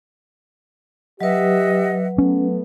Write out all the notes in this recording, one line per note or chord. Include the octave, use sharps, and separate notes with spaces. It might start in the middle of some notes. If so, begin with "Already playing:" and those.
F#3 G4 B4 D#5 E5 F#5
A3 B3 C#4